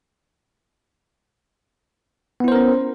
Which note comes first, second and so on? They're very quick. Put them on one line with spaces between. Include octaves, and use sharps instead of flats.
B3 E4 C5 A#4 C#4